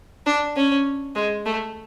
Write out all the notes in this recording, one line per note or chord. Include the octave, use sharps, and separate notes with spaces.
D4
C#4
G#3
A3